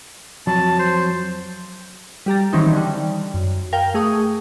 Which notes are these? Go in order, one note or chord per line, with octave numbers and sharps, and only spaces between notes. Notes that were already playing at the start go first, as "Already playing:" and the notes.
F2 F#3 A5
C5
G3 G4 A#5 A6
D#3 E3 F#3 C4 C#4 D#4
D3 G3
F#2
A#4 F5 G5
A3 G#4 C#6 D#6